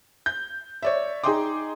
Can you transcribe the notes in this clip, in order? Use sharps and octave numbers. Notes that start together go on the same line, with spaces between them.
G6
C#5 D5 E5
D#4 G#4 D#5 G5 C6 D6